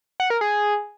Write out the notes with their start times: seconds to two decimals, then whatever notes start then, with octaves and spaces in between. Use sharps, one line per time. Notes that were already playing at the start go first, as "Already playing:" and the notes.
0.20 F#5
0.30 A#4
0.41 G#4